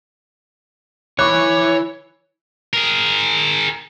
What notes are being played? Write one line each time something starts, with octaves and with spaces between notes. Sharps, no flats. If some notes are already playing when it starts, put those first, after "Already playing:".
E3 C#5 B5 C#6 D6 F#6
G#4 A#4